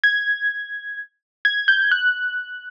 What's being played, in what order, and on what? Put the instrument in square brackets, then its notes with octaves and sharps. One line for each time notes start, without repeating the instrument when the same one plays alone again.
[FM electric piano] G#6
G#6
G6
F#6